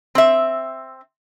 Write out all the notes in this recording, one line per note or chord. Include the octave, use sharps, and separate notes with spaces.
C4 E5